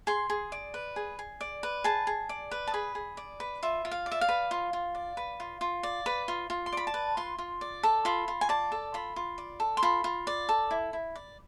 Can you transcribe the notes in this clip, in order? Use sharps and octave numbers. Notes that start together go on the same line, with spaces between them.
G#4 C6
G#4
D5
B4
G#4
G#4
D5
B4
G#4 A5
G#4
D5
B4
A5
G#4 B5
G#4
D5
B4
F4 E5
F4
F5
D5
E5
F5
B4
F4
F4
D5
B4
F4
F4
D5
B4
F4
F4
C6
D5 B5
A5
B4
F4 C6
F4
D5
A4
F4 B5
F4
G#5
D5 A5
A4
F4 B5
F4
D5
A4
C6
F4 B5
F4
D5
A4
E4
E4
D5